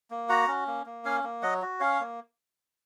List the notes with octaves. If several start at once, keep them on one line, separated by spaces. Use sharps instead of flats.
A#3
F#4 F#5 A#5
C#4
A#3
A#3
C#4 F5 G#5
A#3
F#3 D#5 F#5
F#4
C#4 C#5 F5
A#3